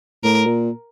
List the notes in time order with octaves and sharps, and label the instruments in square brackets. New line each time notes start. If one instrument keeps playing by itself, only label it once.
[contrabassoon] A2 [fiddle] A#4
[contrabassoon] A#2